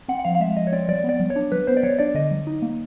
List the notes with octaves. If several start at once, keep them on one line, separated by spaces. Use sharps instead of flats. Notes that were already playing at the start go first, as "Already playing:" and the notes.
C4 F#5
F#5
F3 F5
F5
G#3 E5
F3 D#5
C#5
C4 D5
F#3 D5
B3 D5
F#3
C#5
D4
F#3 B4
B3 C5
D5
F#3 C#5
D4 D5
D3 D#5
F#3
D#4
A#3